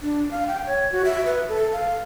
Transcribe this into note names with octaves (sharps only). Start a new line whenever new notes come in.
D4
F5
G5
C#5
F#4
E5
B4
A4
F5